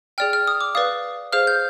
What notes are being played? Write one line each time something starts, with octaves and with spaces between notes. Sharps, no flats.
G#4 D5 G5 F6
F6
D#6
D6
B4 D5 F5 D#6
G#4 C5 F5 F6
G6